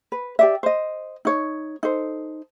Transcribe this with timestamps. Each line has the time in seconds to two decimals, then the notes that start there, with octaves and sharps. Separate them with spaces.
0.12 B4
0.39 G4 D5 E5
0.63 C5 D#5
1.25 D#4 C#5
1.83 D#4 A4 C5